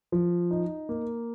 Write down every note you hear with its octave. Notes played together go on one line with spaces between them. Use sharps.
F3
D#4
A#3